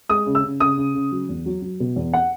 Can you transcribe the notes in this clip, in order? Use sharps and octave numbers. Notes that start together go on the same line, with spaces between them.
G#3 D#6
C#3
E6
C#3
C#3 D#6
C#3
C#3
F#3
E2
F#3
F#3
B2
E2
F#5